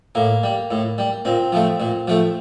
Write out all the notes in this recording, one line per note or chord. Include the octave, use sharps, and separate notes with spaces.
A2 A#3
G3
A2
G3
A#2 C4
F3 A3
A#2
F3 A3